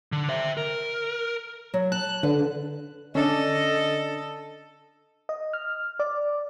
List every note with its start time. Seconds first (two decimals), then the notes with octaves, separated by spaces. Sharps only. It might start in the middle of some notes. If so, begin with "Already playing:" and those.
0.12 D3
0.29 C5 E5
0.57 A#4
1.74 F#3
1.92 A5 F#6
2.23 D3 B4
3.15 D3 C#4 D4 A4 D#5
5.29 D#5
5.53 F6
5.99 D5